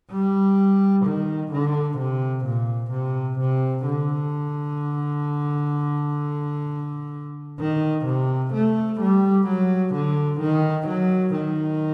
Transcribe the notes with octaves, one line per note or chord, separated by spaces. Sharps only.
G3
D#3
D3
C3
A#2
C3
C3
D3
D#3
C3
A3
G3
F#3
D3
D#3
F#3
D#3